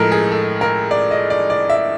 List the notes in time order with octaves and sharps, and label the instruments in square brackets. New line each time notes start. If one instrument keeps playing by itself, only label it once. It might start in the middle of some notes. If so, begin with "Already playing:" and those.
Already playing: [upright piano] A2 F3 G#3 A4 A#4
G#4
A4
A#4
D5
D#5
D5
D5
E5